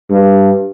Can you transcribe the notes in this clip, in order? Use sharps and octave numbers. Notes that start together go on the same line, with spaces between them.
G2